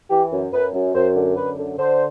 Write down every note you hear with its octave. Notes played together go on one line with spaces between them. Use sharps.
E3 G4
F#2
F#2 B4
F#2
F#2 C5
D3
F#2 B4
D3
D3 C5